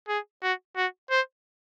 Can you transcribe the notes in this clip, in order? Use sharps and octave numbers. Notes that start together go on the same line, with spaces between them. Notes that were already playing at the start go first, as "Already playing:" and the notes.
G#4
F#4
F#4
C5